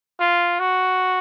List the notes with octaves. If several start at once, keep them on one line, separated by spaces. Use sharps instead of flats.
F4
F#4